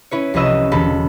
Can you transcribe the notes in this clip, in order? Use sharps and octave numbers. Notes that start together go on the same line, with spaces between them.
C#4 E4 B4 C#5
C2 F3 C#4 B4 D#5 E6
E1 D3 A4 A5 B5 A6